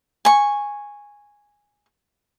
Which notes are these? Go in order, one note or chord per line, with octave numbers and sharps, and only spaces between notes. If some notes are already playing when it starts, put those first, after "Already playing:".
G#5 C#6